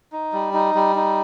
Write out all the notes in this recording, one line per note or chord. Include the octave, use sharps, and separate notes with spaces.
D#4
G3
D#4
G3
D#4